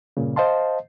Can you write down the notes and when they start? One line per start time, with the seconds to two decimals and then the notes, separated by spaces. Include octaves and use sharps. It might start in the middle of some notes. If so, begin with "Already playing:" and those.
0.17 G2 A#2 C#3
0.36 C5 D#5 F5 A5 C6